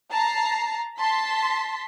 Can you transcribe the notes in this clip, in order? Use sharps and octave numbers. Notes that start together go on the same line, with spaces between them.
A5 A#5 C7
A5 C6 B6